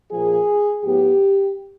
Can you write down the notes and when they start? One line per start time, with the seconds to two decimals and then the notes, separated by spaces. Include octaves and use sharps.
0.11 A#2 F3 A#3 G#4
0.84 A2 F#3 B3 G4